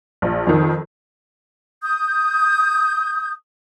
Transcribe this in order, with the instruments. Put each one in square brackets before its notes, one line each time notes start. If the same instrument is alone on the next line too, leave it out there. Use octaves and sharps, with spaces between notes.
[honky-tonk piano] A#1
F2 D#3
[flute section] D#6 G6